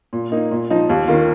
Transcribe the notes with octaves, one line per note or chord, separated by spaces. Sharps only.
A#2
A#3 D#4
A#2
F3 D#4
D#2
D#3 A#3 F4